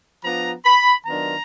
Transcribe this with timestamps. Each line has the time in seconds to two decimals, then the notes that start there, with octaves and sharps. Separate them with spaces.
0.24 F3 B3 D4 F4 A#5
0.65 B5
1.06 D#3 F#3 B3 D4 F4 A#5